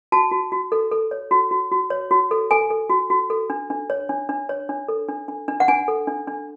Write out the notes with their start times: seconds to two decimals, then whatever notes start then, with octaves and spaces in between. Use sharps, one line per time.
0.12 F#4 A5
0.31 F#4
0.52 F#4
0.72 A4
0.92 A4
1.11 C#5
1.31 F#4
1.51 F#4
1.72 F#4
1.90 C#5
2.11 F#4
2.31 A4
2.51 A4 G#5
2.70 A4
2.90 F#4
3.10 F#4
3.30 A4
3.50 D4
3.70 D4
3.90 C#5
4.09 D4
4.29 D4
4.49 C#5
4.69 D4
4.88 A4
5.09 D4
5.28 D4
5.48 D4
5.60 F#5
5.68 D4 G#5
5.88 A4
6.07 D4
6.28 D4